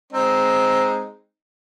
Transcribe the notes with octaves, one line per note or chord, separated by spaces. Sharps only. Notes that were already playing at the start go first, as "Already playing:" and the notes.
G#3 C4 D#4